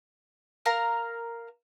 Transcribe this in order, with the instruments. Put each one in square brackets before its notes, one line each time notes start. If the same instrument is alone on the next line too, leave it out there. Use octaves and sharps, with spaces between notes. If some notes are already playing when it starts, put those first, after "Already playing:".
[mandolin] A#4 F5 A#5